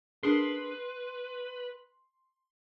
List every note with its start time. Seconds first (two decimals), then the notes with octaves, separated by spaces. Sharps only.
0.23 D4 G#4 A#4 B4 C6